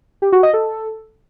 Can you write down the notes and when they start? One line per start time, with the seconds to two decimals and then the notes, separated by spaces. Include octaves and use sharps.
0.22 G4
0.32 F#4
0.43 D#5
0.53 A4